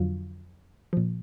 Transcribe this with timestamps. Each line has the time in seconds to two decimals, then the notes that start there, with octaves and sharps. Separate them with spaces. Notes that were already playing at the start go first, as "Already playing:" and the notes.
Already playing: F2 D3 F#3 F4
0.93 A#2 F3